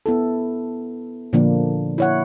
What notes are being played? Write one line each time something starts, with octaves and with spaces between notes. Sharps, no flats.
B3 E4 A4
A#2 D3 F3 A#3 D4
E4 C#5 F#5